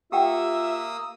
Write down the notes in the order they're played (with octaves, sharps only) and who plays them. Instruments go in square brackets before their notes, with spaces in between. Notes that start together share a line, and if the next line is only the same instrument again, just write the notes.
[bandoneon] A#3 D#6 E6 [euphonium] F4 [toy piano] G4 F#5 G5 [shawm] E5